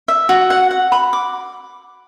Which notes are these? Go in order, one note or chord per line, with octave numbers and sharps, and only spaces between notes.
E5
F#4
F#5
F#5
B5
D6